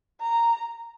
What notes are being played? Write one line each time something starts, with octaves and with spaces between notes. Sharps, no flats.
A#5